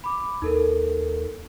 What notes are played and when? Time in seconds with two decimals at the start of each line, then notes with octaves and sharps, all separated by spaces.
0.04 B5 D6
0.42 D#2 D#4 A4 A#4